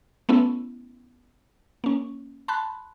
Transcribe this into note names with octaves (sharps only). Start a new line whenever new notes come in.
A3 B3 C#4 E4
A#3 C#4
A5 B5 C6 F#6